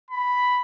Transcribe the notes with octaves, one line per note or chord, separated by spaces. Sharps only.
B5